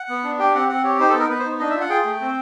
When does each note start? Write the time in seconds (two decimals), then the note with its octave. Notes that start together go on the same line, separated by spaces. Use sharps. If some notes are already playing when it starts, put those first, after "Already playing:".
Already playing: F#5
0.09 B3
0.24 D4
0.39 G4 G5
0.55 C4 F#5
0.69 C4 F#5
0.84 G4 C#5
0.99 D#4 C5
1.09 A4
1.14 B3 A#4
1.29 B3 B4
1.39 C5
1.44 D#4
1.59 D4 D#5
1.70 E5
1.75 F4
1.81 F#5
1.90 G#4 G5
2.05 A3
2.21 C4